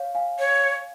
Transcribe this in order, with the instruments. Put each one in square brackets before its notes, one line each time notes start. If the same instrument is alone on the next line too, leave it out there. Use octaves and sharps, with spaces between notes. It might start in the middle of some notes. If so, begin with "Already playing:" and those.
Already playing: [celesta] C#5 F5
F5 G#5
[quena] C#5